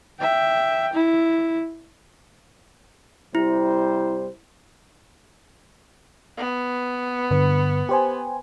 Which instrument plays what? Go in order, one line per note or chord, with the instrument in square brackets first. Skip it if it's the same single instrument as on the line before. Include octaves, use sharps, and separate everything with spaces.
[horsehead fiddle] E5 G5
E4
[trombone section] C3 G3 C5 [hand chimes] E4
[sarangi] B3
[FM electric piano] G2 D3 B4
G4 C5 G#5